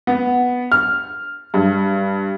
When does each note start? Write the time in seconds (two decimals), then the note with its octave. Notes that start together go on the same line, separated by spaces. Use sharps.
0.07 B3
0.72 F6
1.54 G2